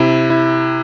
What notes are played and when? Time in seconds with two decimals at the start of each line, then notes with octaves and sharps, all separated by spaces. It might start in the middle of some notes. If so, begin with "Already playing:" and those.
Already playing: C3 E4
0.30 E4